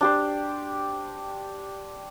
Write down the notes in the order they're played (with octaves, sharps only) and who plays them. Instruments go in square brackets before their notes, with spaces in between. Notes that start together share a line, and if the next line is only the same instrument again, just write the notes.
[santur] D4 G4 C5